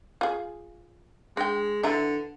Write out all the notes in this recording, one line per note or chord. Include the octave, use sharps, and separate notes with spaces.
F4 G#4
G#3 D4 G5
D3 E3 E5 A#5